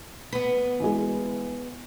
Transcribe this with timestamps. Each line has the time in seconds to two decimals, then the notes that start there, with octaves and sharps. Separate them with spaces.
0.33 B3 B4
0.80 E3 G#3 G#4